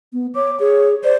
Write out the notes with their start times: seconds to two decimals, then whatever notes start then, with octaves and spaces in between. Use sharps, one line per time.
0.13 B3
0.35 C#5 D6
0.60 G#4 C#5
1.04 C5 D5